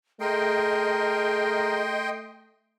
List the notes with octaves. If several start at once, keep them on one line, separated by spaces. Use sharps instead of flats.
A3 G#4 A#4 D#5 G5 C6